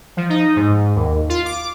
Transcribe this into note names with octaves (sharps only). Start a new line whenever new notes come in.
F3
D#4
G#2
D#2
F4
D6